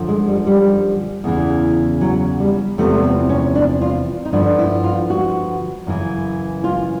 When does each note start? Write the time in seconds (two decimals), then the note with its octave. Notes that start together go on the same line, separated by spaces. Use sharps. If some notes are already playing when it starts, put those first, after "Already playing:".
Already playing: F#2 D3 F3
0.08 G#3
0.28 G3
0.47 G3
1.24 E2 C#3 E3
2.01 F#3
2.40 G3
2.78 E2 C3 F3 A3
2.94 B3
3.04 C4
3.29 C#4
3.55 D4
3.81 F4
4.25 D#4
4.33 G2 D3 F3 D4
4.59 E4
4.84 F4
5.10 F#4
5.87 F#2 C#3 E3
6.64 F4